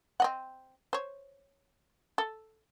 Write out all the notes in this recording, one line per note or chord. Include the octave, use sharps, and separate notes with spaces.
C4 D#5 F#5
C5 C#5
A4